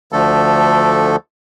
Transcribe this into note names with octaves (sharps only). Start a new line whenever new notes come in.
D2 D3 F3 A3 A4